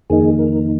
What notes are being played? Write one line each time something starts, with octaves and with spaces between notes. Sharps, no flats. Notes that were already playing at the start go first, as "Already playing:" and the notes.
F2 D#3 A#3 D#4 G#4
A#4